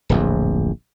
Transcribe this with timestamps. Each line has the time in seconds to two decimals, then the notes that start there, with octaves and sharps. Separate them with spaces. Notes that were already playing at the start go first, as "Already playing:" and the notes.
0.09 D1 A#1 F2